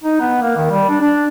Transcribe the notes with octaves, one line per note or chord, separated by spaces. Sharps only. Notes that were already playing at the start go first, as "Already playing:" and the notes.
D#4
B3
A#3
D#3
G3
D4
D4